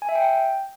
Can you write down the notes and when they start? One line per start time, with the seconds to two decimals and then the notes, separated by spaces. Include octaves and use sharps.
0.02 G#5
0.09 E5
0.15 G5